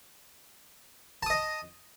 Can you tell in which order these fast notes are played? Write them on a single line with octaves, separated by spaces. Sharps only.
A5 D#6 D#5